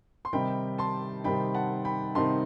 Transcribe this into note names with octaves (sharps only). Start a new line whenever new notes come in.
C6
C3 D#3 G3 C4 D#4 G5 B5
A5 C6
C3 D#3 G3 C4 D#4 G5 B5
F#5 A5
G5 B5
C3 D#3 G3 C4 D#4 A5 C6